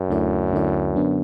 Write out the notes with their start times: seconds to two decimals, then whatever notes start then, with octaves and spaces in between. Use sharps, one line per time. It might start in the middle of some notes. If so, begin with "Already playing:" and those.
Already playing: F#2
0.09 D2 D3 A3 E4 D5
0.52 D2 D3 A3 E4 D5
0.95 D3 F#3 B3 D4